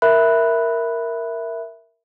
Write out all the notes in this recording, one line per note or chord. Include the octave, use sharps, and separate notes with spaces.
A#4 E5 B5 F#6